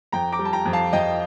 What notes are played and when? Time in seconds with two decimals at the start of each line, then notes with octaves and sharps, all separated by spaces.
0.12 F2 G5 A#5
0.32 A#5 D6
0.39 G3
0.45 A5
0.53 G5 A#5
0.66 F2
0.73 F5 A5
0.93 F2 D#5 G5